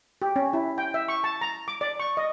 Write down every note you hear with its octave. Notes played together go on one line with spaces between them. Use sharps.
G4
C#4
E4
G5
E5
C#6
A5
A#5
D6
D5
C#6
D#5